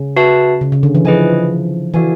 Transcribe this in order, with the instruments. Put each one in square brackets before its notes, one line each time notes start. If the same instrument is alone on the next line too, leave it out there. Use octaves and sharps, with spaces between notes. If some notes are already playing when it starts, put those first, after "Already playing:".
Already playing: [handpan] C#3
[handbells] F#4 B4 E5 A5
[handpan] C#3
C#3
D3
E3
[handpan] F3 [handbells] G#4 B4 D#5 G#5
[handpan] E3 [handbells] F#4 A4 D5 F5 G#5